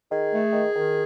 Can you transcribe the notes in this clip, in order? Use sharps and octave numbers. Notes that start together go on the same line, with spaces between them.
D#3 G#4
A3
D#3
D#3